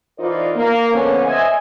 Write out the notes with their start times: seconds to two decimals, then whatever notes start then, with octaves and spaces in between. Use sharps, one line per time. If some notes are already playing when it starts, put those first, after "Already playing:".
0.18 E3 D#4 F4 A#4 C5 D5
0.56 A#3
0.92 D3 F3 B3 C#4
1.26 C5 D#5 E5 G#5